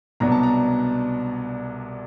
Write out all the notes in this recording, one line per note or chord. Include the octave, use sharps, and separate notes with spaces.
C2 B2 F#3 B3 D4 A#5
A5
A#5